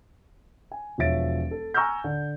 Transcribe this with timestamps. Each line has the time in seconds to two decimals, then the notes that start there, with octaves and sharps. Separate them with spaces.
0.72 G#5
0.98 E1 F3 C#5 E5 A6 D7
1.51 A4
1.74 G#5 A#5 C#6 E6 F6 G6
2.04 D3